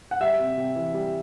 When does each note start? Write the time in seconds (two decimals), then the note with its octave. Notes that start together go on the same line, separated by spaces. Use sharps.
0.11 F#5
0.21 G3 E5
0.39 C3
0.57 C3
0.76 E3
0.94 G3